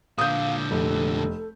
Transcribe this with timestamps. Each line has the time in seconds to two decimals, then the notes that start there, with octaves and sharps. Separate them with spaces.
0.18 A#2 D3 F5 D#6 G6
0.71 F1 A4